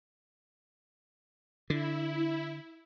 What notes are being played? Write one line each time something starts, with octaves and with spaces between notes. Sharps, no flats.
D3 E4